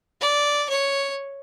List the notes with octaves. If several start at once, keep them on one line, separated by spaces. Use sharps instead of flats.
D5
C#5